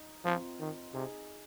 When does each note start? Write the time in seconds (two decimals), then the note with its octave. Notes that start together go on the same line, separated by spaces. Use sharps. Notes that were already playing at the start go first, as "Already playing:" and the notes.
Already playing: D#4
0.25 F3 C4 F4
0.59 D#3
0.94 C3 D#4 G#4